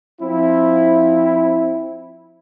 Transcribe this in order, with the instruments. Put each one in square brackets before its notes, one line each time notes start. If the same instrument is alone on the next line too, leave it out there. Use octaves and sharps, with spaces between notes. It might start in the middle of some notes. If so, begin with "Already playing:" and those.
[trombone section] F3 C4 E4